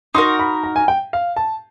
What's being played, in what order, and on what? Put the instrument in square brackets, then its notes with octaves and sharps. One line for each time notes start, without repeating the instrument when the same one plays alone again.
[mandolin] D#4 F#4 A#4 [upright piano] C6
[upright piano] B5
A#5
G#5
G5
F5
A5